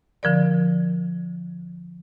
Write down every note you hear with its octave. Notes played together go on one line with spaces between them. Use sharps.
D3 F3 A#4 D5